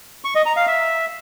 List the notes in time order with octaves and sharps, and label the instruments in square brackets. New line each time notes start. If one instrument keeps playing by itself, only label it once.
[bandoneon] C#6
D#5
A#5
F5
E5